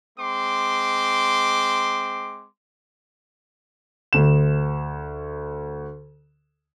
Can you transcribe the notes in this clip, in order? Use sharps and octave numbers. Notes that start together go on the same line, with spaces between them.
G#3 C4 C6 D6
D2 E7